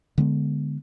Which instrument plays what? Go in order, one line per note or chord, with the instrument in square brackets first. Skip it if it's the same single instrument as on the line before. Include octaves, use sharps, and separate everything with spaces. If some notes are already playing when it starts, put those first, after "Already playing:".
[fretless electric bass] D3 G#3 B3